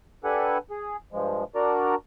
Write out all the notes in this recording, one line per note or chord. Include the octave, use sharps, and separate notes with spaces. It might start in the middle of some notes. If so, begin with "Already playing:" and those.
D4 G4 A4 B4 F#5 G#5
G#4
G2 F3 G#3
D4 F#4 A#4 D5 A#5